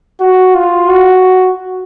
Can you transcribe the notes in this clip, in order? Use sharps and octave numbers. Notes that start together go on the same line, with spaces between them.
F#4
F4
F#4